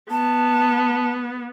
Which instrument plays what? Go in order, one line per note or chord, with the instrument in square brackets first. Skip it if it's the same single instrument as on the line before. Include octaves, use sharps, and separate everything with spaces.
[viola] B3 [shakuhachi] A5